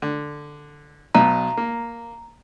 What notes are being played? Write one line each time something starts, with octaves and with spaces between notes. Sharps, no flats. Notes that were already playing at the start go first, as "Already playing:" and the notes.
D3
B1 B2 A#5
A#3